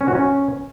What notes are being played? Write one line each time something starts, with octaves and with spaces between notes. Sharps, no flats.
C#4
F#4
C#4